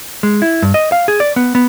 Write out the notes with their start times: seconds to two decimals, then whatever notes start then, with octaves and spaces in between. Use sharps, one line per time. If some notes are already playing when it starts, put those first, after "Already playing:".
0.23 G#3
0.42 E4
0.62 G2
0.74 D#5
0.92 F5
1.08 G#4
1.20 D5
1.36 B3
1.55 B3